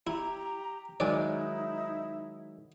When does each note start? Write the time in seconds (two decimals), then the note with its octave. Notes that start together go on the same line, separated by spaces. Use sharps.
0.07 E4 G4 A#5
1.00 D#3 F#3 G#3 D#4 E4 D5 G#5